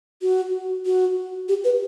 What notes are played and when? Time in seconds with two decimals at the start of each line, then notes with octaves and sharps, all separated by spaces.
0.22 F#4
0.86 F#4
1.49 G4
1.64 B4